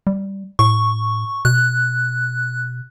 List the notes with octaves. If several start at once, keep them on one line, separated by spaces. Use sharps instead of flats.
G3
A2 C#6
B2 F#6